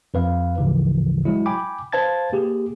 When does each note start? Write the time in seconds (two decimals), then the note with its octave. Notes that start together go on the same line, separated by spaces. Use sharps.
0.14 F2 B4 F5
0.58 A1 D2 G#2 C#3 E3 F3
1.25 F#3 G#3 E4
1.46 G5 G#5 B5 D6
1.92 B4 C5 F5 A5 G#6 A6
2.32 A#3 G4 G#4